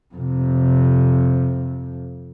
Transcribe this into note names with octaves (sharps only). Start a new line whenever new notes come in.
F2 C3